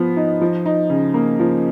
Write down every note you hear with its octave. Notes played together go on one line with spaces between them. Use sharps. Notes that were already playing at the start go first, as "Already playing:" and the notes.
Already playing: F3 B3
D#4
F3
D#4
C#3
A#3
F3